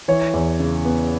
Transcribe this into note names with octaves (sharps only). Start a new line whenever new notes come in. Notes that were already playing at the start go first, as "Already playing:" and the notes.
E3 C#5
E2
C#3
B3